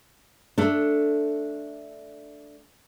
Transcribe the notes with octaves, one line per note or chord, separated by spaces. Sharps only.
A3 D4